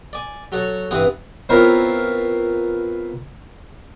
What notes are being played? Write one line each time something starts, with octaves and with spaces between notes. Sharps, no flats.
D5 G#5
F#3 F#4 A4 C#5
G2 E3 C4 F#5 D#6
B3 C4 E4 F4 A#4 C#5